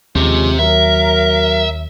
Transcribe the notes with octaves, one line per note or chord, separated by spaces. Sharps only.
D#2 F3 G#3 C4 C#4 G4
F#3 A#4 E5